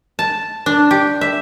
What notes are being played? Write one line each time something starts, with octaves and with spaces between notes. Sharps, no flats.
A5
D4
G4
E5